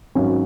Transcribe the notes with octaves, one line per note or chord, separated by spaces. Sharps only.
G#1 G#2 F#3 C#4